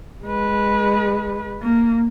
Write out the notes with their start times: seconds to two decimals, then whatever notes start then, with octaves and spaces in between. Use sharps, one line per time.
0.25 G#3 B4
1.62 A#3